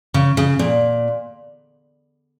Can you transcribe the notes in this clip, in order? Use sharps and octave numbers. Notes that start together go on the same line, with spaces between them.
C#3
C#3
A#2